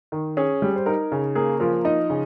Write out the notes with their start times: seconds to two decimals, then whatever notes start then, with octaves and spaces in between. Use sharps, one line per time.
0.12 D#3
0.37 C#4 G#4
0.62 G3
0.76 C5
0.86 D#4 A#4
1.12 C#3
1.35 A#3 G#4
1.60 F3 A#4
1.85 D#4 D#5
2.10 C#3